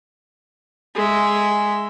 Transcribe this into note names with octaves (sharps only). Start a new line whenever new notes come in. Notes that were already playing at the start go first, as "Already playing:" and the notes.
G#3 E5